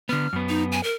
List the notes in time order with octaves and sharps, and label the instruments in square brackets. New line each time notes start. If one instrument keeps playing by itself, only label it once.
[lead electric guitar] D3 B3 [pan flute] F6
[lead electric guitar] F#2 B3
[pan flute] D#4
G#5
A#4